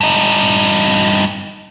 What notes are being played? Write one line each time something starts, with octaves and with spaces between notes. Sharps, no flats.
G2 D#4